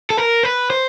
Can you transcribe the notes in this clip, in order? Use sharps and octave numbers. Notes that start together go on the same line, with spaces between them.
A4
A#4
B4
C5